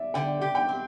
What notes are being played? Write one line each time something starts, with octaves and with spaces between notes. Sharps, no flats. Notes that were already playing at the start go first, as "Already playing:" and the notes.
Already playing: D5 E5
D3 G5
G4
G5
C4